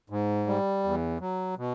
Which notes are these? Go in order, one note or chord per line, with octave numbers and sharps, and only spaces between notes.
G#2
G3
E2
F#3
B2